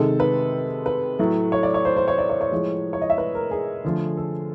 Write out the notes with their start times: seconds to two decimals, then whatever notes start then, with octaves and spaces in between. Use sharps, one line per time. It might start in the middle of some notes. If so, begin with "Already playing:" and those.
Already playing: C3 D#3 G#3 A4
0.20 B4
0.86 B4
1.19 A2 F#3 A3
1.52 C#5
1.63 D5
1.74 C#5
1.85 C5
1.97 C5
2.08 C#5
2.18 D5
2.30 C#5
2.41 C#5
2.52 A2 F3 G#3
2.93 C#5
3.01 D#5
3.10 E5
3.18 B4
3.35 A#4
3.51 G#4
3.84 D3 F3 A3
4.17 A4